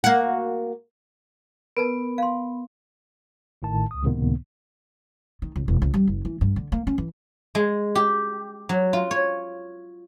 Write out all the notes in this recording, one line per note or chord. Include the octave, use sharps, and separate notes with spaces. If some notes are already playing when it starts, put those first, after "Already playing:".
A#3 F#4
B3 A#4 B4 A5
F5 C6
A1 A2 D#3 A5
C#2 D#6
C#2 A2 C3 D#3 A#3 B3
D#3
C#2
E1
C#2
G3
F#1
E3
G2
D3
A#3
C#4
E3
G#3
G4
F#3
F4
C#5